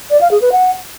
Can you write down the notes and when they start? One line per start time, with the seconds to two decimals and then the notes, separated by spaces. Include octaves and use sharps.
0.10 D5
0.21 F5
0.31 G#4
0.42 B4
0.52 F#5